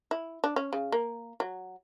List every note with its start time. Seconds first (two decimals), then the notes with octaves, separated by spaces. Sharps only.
0.11 E4
0.44 D4
0.56 C#4
0.73 C#3
0.92 A#3
1.40 F#3